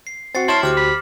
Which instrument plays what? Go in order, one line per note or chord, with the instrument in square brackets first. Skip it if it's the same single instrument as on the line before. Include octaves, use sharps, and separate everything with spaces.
[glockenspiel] C7
[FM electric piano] C4 F#4 [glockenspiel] A6 C7 C#7
[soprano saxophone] E4 [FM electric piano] C#5 A5 [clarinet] C6 [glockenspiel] F6 E7 F#7
[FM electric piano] D2 G4 C5 [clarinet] F#4 [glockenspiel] D6 F6 F#7
[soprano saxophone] B5